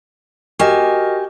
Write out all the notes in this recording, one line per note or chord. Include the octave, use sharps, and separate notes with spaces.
F#4 G4 A#4 D#5 G#5